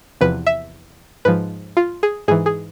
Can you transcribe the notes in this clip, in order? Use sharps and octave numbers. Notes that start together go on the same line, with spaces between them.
E2 C3 F3 B4
E5
G#2 F3 B4
F4
G#4
G#2 E3 G#4
G#4